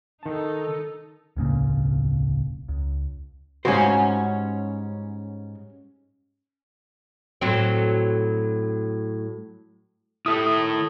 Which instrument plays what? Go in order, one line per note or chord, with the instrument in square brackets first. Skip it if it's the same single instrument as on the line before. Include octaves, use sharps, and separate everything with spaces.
[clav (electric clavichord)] D#3 A5 [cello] D#4 A4
[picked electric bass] D1 B1 C#3 A#3
C#2
[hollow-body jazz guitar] G#2 G3 C5 [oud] C#4 F#4
[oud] A2 F#3 C4
[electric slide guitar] E4 A4 [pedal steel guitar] G4 E5 D#6
[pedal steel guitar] D#3 D#6